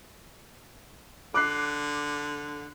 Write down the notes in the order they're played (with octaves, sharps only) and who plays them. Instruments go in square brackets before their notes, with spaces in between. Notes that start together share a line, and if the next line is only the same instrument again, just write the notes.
[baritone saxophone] D3 [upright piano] D6 F#6 C7